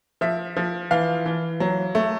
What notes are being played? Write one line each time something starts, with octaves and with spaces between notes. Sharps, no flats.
F3 E5
F3
E3 F5
E3
F#3
A3